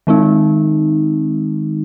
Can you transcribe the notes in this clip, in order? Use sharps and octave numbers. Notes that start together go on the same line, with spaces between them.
D#3 G#3 C4 D#4